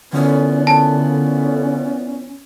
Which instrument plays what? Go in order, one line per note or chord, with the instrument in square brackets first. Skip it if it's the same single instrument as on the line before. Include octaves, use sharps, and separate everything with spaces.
[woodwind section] A#2 E3 B3 [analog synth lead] D3 [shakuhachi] C#4
[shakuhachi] C#4 [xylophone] A5